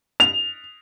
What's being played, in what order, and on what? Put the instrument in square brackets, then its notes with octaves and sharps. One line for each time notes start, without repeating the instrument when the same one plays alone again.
[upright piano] F7